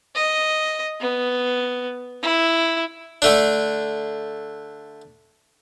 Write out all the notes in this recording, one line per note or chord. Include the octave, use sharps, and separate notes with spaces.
D#5
B3
E4
D3 A3 D4